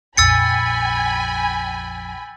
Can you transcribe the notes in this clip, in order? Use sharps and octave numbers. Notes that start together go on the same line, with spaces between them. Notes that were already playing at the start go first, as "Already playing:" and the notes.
A#1 F2 G5 G#5 B5 E6 A6 C#7